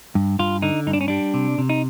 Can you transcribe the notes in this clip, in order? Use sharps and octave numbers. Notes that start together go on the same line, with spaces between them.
G2
G2 F4
D3 D#4
G2 D#4
D4
C#4
G3 D4
C3
C3
D#4